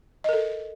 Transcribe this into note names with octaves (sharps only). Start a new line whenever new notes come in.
A4 A#4 D#5